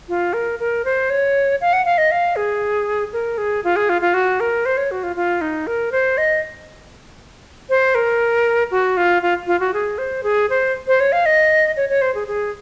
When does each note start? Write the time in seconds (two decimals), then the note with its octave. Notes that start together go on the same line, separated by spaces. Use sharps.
0.09 F4
0.33 A#4
0.59 A#4
0.85 C5
1.10 C#5
1.61 F5
1.73 F#5
1.85 F5
1.98 D#5
2.11 F5
2.36 G#4
3.13 A#4
3.38 G#4
3.64 F4
3.76 G#4
3.89 F4
4.02 F4
4.14 F#4
4.40 A#4
4.66 C5
4.77 C#5
4.91 F#4
5.03 F4
5.16 F4
5.41 D#4
5.67 A#4
5.92 C5
6.18 D#5
7.69 C5
7.95 A#4
8.71 F#4
8.97 F4
9.22 F4
9.47 F4
9.60 F#4
9.74 G#4
9.98 C5
10.23 G#4
10.50 C5
10.87 C5
11.00 C#5
11.12 F5
11.26 D#5
11.77 C#5
11.89 C#5
12.02 C5
12.15 G#4
12.28 G#4